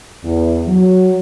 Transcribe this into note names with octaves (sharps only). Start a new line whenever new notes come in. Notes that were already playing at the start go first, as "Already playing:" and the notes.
E2
F#3